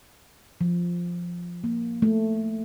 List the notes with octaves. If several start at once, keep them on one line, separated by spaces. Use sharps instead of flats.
F3
A#3
A3